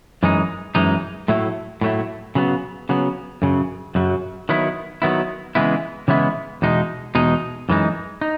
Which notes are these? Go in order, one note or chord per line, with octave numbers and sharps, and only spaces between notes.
F#2 E3 G#3 D#4
F#2 E3 G#3 D#4
A2 F#3 A3 E4
A2 F#3 A3 E4
C#3 F#3 B3
C#3 F#3 B3
F#2 C#3 F#3
F#2 C#3 F#3
D#3 F#3 B3 E4
D#3 F#3 B3 E4
C#3 E3 G#3 B3 E4
C#3 E3 G#3 B3 E4
E2 B2 G#3 D#4
E2 B2 G#3 D#4
F#2 E3 G#3 D#4
D#4